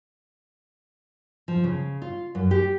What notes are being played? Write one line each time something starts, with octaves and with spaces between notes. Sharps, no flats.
F3
C#3
F4
F#2
G4